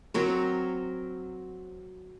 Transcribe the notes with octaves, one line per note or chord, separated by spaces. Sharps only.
F#3 C4 A#4 C#5